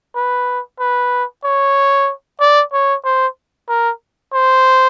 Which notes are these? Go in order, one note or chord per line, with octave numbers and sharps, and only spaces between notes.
B4
B4
C#5
D5
C#5
C5
A#4
C5